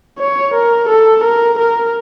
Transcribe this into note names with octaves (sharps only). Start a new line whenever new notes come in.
C#5
A#4
A4
A#4
A#4